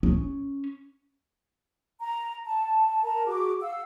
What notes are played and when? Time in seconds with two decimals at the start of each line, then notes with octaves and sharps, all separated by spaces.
0.03 C#4
2.01 A#5
2.45 A5
3.03 A#4 A5 A#5
3.26 F#4 G#4 D6
3.61 F5 F#5 E6